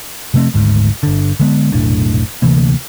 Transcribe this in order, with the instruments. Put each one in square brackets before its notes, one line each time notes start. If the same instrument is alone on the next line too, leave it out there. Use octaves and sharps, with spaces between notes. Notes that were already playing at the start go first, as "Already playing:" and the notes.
[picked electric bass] C3 F3 A3 C4
G#1 D2 G#2
G1 D3
D3 G#3 B3
F1 B1 A2 D4
D2 C3 E3 A#3